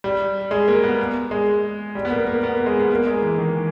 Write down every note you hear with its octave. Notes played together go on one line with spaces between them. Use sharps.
G3
G#3
A#3
B3
G#3
G3
B3
A#3
A#3
B3
A#3
G#3
B3
A#3
G#3
E3
D#3